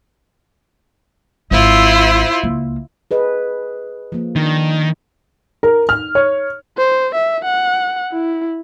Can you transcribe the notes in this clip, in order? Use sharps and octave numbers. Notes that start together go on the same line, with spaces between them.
G#1 E4 F4 C5
C#2 A#3
G#4 B4 D#5
F3 A#3
D#3 D4
A#4
F6
C#5
C5
E5
F#5
E4